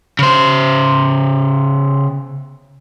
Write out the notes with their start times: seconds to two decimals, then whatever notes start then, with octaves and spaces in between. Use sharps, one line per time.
0.19 C#3 C5